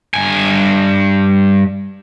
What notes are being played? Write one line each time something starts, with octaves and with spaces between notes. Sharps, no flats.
G2 G#5